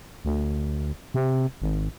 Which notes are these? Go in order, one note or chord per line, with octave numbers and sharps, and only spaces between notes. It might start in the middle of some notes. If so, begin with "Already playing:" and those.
D2
C3
G#1